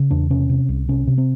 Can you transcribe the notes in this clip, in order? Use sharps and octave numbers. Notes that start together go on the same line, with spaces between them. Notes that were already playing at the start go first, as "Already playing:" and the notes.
Already playing: C#3
E2 D4
C3 C#4
C3
C2
C3 C#4
C3
C4